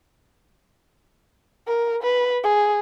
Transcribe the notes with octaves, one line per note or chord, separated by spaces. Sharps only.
A#4
B4
G#4